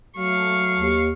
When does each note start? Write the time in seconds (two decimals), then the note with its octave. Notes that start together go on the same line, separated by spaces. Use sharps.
0.17 F#3 A3 F5 C#6
0.75 D#2